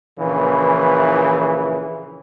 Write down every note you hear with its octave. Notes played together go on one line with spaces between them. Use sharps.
A#1 C#3 E3